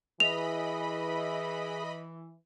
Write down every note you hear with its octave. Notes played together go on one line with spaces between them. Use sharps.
E3 G#4 B4 D#5 E5 B5 F7